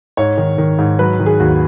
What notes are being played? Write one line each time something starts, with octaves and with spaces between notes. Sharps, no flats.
G#2 C#5
D#3
D#3
G#2
F#3 B4
D#3
G#4
D#2 F#4